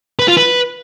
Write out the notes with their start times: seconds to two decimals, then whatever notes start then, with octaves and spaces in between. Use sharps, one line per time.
0.19 B4
0.28 F4
0.37 B4